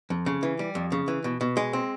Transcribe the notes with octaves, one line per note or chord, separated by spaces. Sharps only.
F2
C#3
E3
G3
F2
C#3
E3
B2
B2
G#3
C4